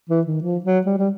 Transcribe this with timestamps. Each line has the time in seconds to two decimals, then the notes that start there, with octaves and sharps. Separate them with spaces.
0.10 E3
0.27 D#3
0.42 F3
0.64 F#3
0.86 G3
0.98 G3